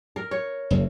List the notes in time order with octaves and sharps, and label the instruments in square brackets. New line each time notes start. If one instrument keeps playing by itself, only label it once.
[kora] A#4
C#5
[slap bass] F#1